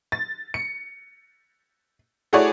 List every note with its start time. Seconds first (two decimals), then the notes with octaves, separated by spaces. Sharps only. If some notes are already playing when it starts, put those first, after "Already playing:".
0.12 A6
0.54 C#7
2.33 A3 E4 F#4 G#4 C#5 D5